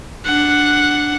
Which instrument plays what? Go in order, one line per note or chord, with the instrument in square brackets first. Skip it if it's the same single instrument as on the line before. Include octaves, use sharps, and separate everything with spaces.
[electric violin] D4 F#5